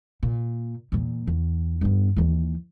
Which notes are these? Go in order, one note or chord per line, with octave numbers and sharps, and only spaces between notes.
A#2
E2 A#2
E2
G2 B3
D#2 E3